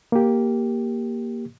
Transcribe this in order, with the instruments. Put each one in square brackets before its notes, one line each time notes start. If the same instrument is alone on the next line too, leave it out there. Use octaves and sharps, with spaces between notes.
[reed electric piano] A#3 G4